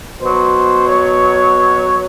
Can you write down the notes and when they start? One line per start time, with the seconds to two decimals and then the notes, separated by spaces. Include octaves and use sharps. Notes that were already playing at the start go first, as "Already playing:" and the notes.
0.22 B2 F#3 C5
0.87 C#5